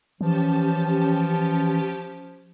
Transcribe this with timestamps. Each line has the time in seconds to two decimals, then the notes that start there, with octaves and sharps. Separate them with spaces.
0.21 E3 F3 C#4 G4 A5